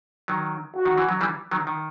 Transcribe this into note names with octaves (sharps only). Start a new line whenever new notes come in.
D#3 F#3
F#4
D#3
E3
F#3
E3 G3
D#3 F#3
D#3